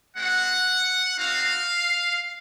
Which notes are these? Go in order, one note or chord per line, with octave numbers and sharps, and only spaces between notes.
G#3 C4 F#4 F#5
C4 D#4 F#4 F5